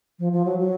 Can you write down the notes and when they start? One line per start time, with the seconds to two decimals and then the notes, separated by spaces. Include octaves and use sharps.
0.19 F3
0.33 F3
0.45 F#3
0.59 F#3